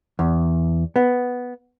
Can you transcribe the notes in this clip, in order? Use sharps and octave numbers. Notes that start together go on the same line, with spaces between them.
E2
B3